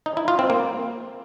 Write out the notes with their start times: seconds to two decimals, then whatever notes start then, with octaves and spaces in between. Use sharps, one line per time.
0.06 D#4
0.17 E4
0.28 F4
0.39 C4
0.50 A#3